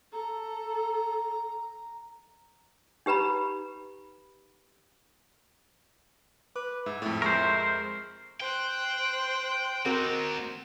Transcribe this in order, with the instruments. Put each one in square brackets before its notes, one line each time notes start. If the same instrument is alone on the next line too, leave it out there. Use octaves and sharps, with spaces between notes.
[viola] A4 [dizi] A#5
[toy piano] D#4 G4 B4 A#5 B5
[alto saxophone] B4 [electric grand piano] D6
[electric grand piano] G#2 [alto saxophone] E5
[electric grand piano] F2 A2
[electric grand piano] F2 G#3 C#6 [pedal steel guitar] A#4 C5
[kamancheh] C5 F#6 [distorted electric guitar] G5
[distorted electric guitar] A#3 D#4 [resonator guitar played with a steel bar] C4 F#4 A#4